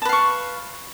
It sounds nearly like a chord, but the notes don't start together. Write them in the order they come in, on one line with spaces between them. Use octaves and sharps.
A5 B4 F5 C#6